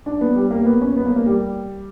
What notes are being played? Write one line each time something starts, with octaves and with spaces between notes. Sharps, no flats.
D4
B3
G3
A#3
B3
C#4
B3
A#3
A#3
G3